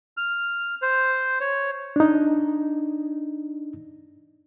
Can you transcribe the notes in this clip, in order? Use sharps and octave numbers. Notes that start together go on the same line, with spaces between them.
F6
C5
C#5
D4 D#4